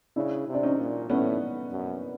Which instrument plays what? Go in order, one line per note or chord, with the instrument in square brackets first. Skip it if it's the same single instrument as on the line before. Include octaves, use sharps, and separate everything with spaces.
[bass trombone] C#3 [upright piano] D4 E4
[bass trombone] C3
[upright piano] D4
C#4 D#4
[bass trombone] A#2
[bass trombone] A2 [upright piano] B3 C#4
[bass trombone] F#2